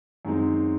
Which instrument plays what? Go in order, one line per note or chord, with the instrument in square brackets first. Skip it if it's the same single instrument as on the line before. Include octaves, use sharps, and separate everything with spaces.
[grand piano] F#2 D#3 G#3 C4 D#4